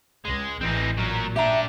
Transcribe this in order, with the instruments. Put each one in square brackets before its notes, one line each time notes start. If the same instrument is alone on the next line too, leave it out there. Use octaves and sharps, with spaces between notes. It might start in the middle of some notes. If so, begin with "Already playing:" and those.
[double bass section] C#2 [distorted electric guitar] G#3
[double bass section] A1 E3 [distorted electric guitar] C4 D#4
[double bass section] A#2 [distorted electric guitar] F#3 A#4
[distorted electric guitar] D4 G4 [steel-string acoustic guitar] E5 G5 A#5